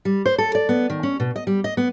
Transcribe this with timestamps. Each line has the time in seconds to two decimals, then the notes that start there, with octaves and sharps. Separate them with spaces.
0.05 G3
0.26 C5
0.38 A4
0.55 D5
0.69 B3
0.90 D#3
1.03 C#4
1.20 B2
1.36 D#5
1.47 G3
1.64 D#5
1.77 B3